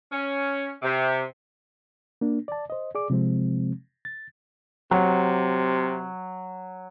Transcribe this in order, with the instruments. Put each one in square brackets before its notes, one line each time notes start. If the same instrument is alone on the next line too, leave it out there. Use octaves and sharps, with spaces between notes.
[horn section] C#4
C3
[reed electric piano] A#3 D4
D5 A5
C5 D#5
G#4 D5 D6
C3 F3 G#3 C4
A6
[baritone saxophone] C3 [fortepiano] F#3